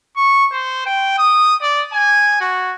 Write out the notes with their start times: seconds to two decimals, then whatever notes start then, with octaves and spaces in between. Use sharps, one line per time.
0.17 C#6
0.51 C5
0.86 G5
1.18 D#6
1.62 D5
1.93 G#5
2.41 F#4